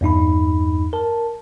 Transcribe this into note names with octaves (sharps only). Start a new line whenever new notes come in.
E2 G2 D#4 B5
A#4 A5